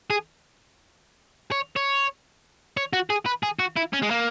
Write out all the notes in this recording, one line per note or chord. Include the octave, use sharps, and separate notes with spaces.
G#4
C#5
C#5
C#5
F#4
G#4
B4
G#4
F#4
E4
C#4
G#3
A#3